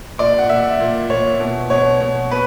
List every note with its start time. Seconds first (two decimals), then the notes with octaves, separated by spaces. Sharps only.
0.18 A#2 D5
0.38 F#5
0.49 A#2 E5
0.80 A#2
1.10 A#2 C#5
1.40 B2
1.70 B2 C#5
2.01 B2
2.31 B2 B4